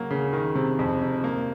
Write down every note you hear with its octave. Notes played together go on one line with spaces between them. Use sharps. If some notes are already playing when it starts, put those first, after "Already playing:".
Already playing: C#3 F#3 A#3
C#3
D#3
C3
F2
C3
A#3